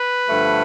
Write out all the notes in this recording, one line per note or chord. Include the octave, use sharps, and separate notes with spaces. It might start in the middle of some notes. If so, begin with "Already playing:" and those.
Already playing: B4
G2 D3 F3 A3